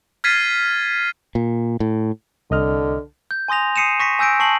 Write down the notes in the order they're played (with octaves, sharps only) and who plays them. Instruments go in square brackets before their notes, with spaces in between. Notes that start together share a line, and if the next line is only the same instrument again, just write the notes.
[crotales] F6 G#6 A6 B6 C7 D#7
[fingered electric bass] A#2
A2
[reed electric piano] C2 D#5 F6 [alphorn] D3
[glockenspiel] G6
G#5 C6 D#6 A#6 F7
D#6 C7 C#7 D#7 E7
C#6 A#6 B6 C#7
G#5 E6 G6 A#6 D7
A5 C#6 C7 F#7